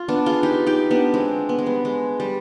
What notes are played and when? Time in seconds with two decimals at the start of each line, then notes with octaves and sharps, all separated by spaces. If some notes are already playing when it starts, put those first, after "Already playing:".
Already playing: F4
0.08 B3 D4
0.26 F4 G#4
0.43 D#4 G4
0.66 D#4 G4
0.91 B3 D4
1.14 G#3 C4
1.49 B3
1.59 G#3
1.66 G3 B3
1.85 G#3
2.20 G3